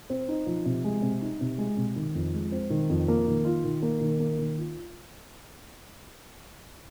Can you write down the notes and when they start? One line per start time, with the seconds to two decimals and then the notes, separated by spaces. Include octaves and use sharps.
0.10 C4
0.28 D#4
0.46 F3
0.65 C3
0.84 G#3
1.02 C3
1.22 D#4
1.41 C3
1.58 G#3
1.77 C3
1.96 D#3
2.15 F2
2.34 G#3
2.52 C4
2.70 D#3
2.89 F2
3.08 A#3
3.27 D#3
3.45 F4
3.64 D#3
3.82 A#3
4.01 D#3
4.20 A#3
4.38 D#3
4.58 F4